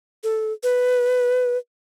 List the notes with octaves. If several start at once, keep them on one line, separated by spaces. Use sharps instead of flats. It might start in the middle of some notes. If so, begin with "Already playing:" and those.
A4
B4